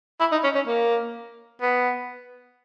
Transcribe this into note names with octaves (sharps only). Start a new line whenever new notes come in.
E4
D#4
C#4
C#4
A#3
B3